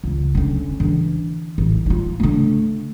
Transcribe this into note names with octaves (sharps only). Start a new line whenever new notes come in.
C#2
D3 C#4
D3 E3
A1
D#4 F4
D3 A3